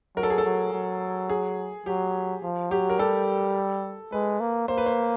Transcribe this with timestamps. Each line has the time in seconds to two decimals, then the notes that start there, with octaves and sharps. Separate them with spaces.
0.16 F#3 A#4
0.23 A4
0.30 G#4
0.38 A4
0.44 F#3
0.73 F#3
1.30 G#4
1.86 F#3 G4
2.43 F3
2.70 F#3 G4
2.89 A#4
2.99 G3 A4
4.12 G#3 B4
4.40 A#3
4.68 A#3 C5
4.78 B4
4.86 C5